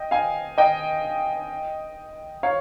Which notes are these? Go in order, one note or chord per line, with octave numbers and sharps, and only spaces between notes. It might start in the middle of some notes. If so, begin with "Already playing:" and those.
Already playing: D#5 G5
F5 G#5
D#5 G5
C#5 F5